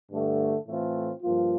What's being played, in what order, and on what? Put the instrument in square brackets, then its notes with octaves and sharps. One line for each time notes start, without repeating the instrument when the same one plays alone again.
[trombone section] G2 D3 A3
A2 E3 A3 C4 F4
G2 F3 A#3 F4